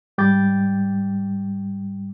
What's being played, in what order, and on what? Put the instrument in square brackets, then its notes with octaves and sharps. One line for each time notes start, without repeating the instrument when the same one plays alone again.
[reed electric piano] G#2 G3 G5 D6 G6 A6